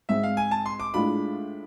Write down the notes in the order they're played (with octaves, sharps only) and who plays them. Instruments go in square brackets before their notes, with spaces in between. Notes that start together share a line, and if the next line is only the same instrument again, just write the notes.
[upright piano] G#2 G#3 C4 [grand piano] E5
[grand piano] F5
G#5
A5
C6
D6
[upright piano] A2 G#3 D4 F4 [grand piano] B5